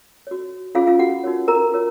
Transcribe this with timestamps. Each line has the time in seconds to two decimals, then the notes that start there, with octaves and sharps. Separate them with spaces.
0.27 F#4 C#5
0.75 C#4 F4 G#4 C#5 F5
0.87 F4 F5
0.99 F#4 F#5
1.24 D#4 F#4 A#4 C#5
1.48 A#4 A#5
1.72 F4 A#4 C#5